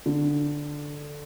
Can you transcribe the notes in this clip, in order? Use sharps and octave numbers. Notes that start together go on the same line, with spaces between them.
D3